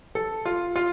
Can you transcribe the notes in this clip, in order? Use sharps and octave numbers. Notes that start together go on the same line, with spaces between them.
A4
F4
F4